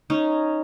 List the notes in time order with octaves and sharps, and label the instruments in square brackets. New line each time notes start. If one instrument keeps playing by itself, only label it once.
[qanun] C#4 D#4